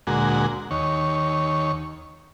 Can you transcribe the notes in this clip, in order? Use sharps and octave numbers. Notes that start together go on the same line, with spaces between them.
D2 A#2 G#3 F#4
D#2 C#5